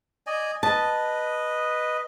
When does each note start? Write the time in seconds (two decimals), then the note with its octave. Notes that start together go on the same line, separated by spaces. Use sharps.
0.27 D5 D#5 G#5
0.63 B4 D#5 A5